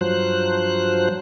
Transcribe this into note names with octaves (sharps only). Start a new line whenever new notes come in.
G2 F3 F#3 C5 F#6